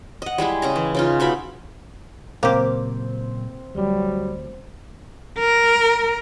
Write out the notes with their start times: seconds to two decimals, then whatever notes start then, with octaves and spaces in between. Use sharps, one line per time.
0.22 D#5 F#5
0.38 G3 G#3 E4 G#4
0.62 C#3 D#5 A#5
0.76 E3
0.95 C#3 D#4 F4
1.20 B2 D#4 E5 B5
2.43 A#2 C#3 F#3 A#3 C4 G4
3.75 D2 F#3 G3
5.39 A#4